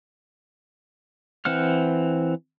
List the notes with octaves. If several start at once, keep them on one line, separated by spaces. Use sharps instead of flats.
E3 C4 F#5 F6